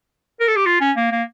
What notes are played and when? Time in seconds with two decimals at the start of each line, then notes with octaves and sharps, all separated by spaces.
0.40 A#4
0.48 A4
0.56 G4
0.66 F4
0.81 C#4
0.97 A#3
1.12 A#3